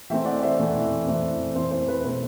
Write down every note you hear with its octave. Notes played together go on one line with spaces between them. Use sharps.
E3 A3 C4 E5 G5
D5 F#5
C5 E5
E3 A3 C4
E3 A3 C4
E3 A3 C4 C5
C5
B4
B2 A3 C4 C5